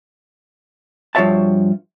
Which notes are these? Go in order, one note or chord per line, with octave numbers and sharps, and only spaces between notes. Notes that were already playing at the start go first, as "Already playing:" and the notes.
G2 F3 F#4 C#5 E5 A5